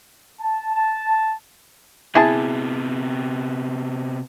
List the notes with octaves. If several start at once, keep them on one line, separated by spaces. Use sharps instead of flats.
A5
A5
C3 B3 E4 G#4 A5